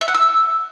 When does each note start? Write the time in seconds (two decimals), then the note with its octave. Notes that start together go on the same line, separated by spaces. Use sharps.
0.01 E5
0.08 F#5
0.14 E6